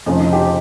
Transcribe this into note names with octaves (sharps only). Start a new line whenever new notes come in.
F1 F2 C#3 F3 D#4
D#4
G4